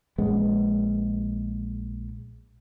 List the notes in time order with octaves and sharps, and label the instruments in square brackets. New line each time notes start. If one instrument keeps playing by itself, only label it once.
[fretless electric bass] A#1 G#3 B3 C#4